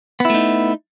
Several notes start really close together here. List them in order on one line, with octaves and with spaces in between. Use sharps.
B3 E4 A3 D#4